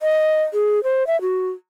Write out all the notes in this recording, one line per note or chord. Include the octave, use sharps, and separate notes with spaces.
D#5
G#4
C5
E5
F#4